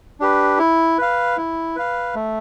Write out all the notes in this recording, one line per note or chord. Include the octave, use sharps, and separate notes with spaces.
D4 G4 B4
E4
B4 F5
E4
B4 F5
A3